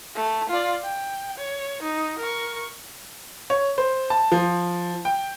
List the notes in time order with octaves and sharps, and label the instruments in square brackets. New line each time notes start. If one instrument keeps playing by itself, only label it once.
[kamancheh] A3
F4 D5
G5
C#5
D#4
A#4 C#6
[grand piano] C#5
C5
A5
F3
G5